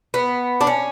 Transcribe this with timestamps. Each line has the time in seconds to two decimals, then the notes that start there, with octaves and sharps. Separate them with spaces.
0.14 B3
0.61 D4
0.67 C#4